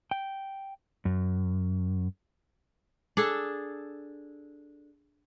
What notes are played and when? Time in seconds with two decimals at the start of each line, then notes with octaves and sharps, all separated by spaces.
0.11 G5
1.05 F#2
3.17 D4 G#4 A4